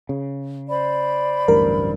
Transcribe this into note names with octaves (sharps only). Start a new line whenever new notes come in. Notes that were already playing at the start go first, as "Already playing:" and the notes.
C#3
C5 D5 B5
D1 A1 G2 A#4